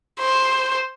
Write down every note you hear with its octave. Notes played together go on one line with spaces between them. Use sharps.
C5